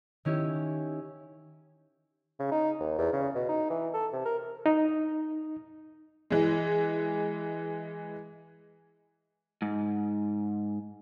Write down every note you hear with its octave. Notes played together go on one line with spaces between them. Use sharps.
D#3 C#4 E4 G4
C#3
D#4
D#2
E2
C#3
B2
D#4
E3
A4
C3
A#4
D#4
E3 G#3
G#2